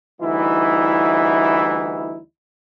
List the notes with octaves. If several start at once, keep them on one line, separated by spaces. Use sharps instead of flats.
D2 E3 G3 D#4 E4